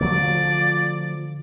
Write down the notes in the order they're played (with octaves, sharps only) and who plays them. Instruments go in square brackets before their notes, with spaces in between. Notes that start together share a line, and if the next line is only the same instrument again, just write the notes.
[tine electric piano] D3 [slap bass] F3 F#3 A3 [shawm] D5